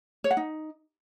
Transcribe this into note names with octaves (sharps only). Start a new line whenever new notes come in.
C#5
F#5
D#4